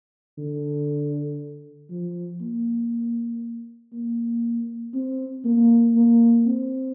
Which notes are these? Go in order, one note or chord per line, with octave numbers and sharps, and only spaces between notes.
D3
F3
A#3
A#3
C4
A#3
A#3
C4